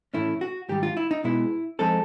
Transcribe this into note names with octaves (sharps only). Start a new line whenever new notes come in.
A2 E3 A3 C#4 E4
F#4
G#2 D#3 G3 G4
F4
E4
D#4
B2 G#3 B3 E4
F3 G#3 C4 D#4 A4